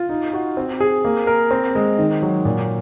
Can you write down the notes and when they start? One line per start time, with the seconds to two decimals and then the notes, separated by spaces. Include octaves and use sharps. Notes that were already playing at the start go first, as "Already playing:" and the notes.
Already playing: F4
0.09 D#4
0.33 F#4
0.57 C4
0.80 G#4
1.05 A#3
1.27 A#4
1.51 C4
1.75 G#3
1.98 D#3
2.22 F#3
2.45 A#2